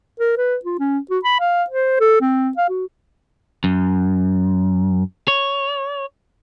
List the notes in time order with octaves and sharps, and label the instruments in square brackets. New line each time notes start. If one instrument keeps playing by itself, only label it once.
[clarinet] A#4
B4
F4
C#4
F#4
B5
F5
C5
A4
C4
F5
F#4
[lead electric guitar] F#2
C#5